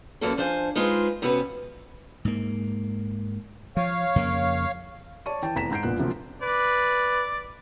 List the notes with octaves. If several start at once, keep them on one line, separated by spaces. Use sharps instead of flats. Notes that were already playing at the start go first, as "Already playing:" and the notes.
F#2 E3 F#3 A#3 F#4 A4
F3 D4 C5 F5 G5 G#5
G#3 D#4 F4 G#4 B4 C5
C3 B3 C#4 F#4 A#4 B4
G#2 A#3
F3 C#5 F5
F2 C#3 A#3
C#5 D5 A5 C#6 D#7
E3 G5 A5
F1 E2 A#5 B6 E7
G#2 A#5 G6 C7 D7
E1 A#1 A#2 B3 F#6
D2 C3 F3 F#3 A#3
B4 D5